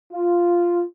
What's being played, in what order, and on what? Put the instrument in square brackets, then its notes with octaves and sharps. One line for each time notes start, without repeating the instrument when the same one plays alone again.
[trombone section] F4